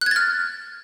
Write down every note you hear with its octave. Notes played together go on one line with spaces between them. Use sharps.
F6 F#6 G#6 A6